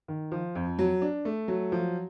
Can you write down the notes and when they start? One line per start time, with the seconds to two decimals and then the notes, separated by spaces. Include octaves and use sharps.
0.08 D#3
0.32 F3
0.55 F2
0.79 F#3
1.02 D4
1.25 A3
1.48 F#3
1.72 F3